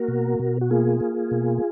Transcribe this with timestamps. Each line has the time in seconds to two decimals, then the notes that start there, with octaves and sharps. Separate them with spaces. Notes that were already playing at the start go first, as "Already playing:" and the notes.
Already playing: A#3 F#4 A#4
0.08 B2
0.39 B2
0.61 F#4
0.71 A#3 F4 G#4
1.00 A#3
1.31 B2